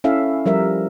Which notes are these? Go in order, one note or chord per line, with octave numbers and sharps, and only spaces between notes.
C#4 E4 A4 E5 F5
F3 G3 A#4 E5